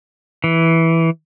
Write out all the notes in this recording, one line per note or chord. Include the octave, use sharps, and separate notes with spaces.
E3